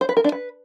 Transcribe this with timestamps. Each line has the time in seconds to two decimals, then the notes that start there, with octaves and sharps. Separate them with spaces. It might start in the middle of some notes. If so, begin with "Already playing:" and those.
0.01 C5
0.09 B4
0.17 A#4
0.24 D4
0.32 B4